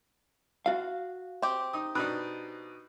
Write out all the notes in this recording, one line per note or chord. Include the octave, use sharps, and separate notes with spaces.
F#4 F5
C4 G4
D#4 D#6
B2 D4 D#4 B5 F#6